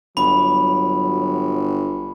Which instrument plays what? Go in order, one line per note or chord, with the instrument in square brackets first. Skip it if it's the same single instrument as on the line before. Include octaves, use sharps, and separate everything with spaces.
[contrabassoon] G1 [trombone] F#3 [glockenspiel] B5